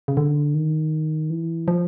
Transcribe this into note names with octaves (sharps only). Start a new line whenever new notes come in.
C#3
D3
D#3
E3
F3